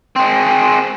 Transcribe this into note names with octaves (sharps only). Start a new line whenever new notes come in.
G#3 C4